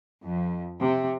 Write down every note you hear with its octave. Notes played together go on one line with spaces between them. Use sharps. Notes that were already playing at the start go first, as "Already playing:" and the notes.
F2
C3